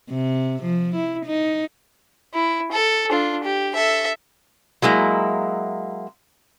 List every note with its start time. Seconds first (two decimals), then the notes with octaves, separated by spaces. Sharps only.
0.10 C3
0.63 F3
0.96 E4
1.26 D#4
2.34 E4
2.72 A4
3.10 D4 F4
3.44 G4
3.75 A4 E5
4.82 F#3 G#3 A#3 E4